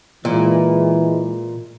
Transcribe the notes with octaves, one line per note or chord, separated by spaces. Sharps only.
A#2 E3 G#3